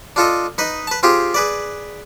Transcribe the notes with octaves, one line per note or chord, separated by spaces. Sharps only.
D4 F4 A4 D#5
D#4 B4 D#5
B4 A5
C4 F4 G4 G#4
G#4 B4 D5